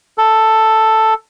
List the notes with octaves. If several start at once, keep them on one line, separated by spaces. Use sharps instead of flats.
A4